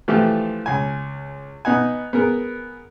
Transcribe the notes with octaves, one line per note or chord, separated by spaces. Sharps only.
E3 F3 A3 F4 G4
C#2 G#5
B3 D#4 F#5 G#5
B3 G#4 A#4